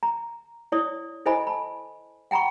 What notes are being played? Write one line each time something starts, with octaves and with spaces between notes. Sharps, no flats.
A#5
E4 C#5 D5 D#6
E4 A4 C5 D#5 G#5 B5
A5 B5
F#5 G5 A#5 B5 C#6